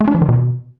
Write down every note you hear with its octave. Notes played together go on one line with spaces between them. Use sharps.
A3
D4
F3
D#3
B2